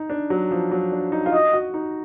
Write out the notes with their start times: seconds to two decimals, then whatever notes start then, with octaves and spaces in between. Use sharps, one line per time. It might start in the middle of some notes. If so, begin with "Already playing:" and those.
Already playing: D#4
0.10 D4
0.30 F#3
0.51 F3
0.71 F#3
0.92 D4
1.12 D#4
1.26 F4
1.33 F#4 D#5
1.53 F#4
1.74 D#4